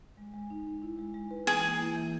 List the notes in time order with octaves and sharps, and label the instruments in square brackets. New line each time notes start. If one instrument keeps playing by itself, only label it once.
[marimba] G#3
G#3
D#4
D#4
E4
G#3
G#3
B4
[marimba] E3 [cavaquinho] G#4
[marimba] A#3
E4
E3